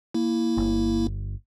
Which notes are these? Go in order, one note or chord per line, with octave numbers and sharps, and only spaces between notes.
A#3 E4
G1